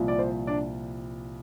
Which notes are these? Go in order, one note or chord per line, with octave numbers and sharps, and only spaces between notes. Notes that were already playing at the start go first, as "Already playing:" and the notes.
Already playing: C2 A#2 F3
D5
C5
D4 D5